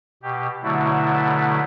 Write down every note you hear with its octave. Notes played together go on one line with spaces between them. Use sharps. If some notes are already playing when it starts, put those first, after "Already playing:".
B2 G4
B2 D3 F#3 A3 E4